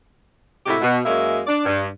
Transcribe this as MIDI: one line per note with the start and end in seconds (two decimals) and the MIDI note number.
0.66 0.77 45
0.66 0.77 48
0.66 0.77 56
0.66 0.77 64
0.66 0.77 66
0.66 0.77 67
0.81 0.99 47
1.06 1.41 42
1.06 1.41 56
1.06 1.41 58
1.06 1.41 61
1.06 1.41 75
1.06 1.41 76
1.47 1.62 62
1.47 1.62 74
1.65 1.86 43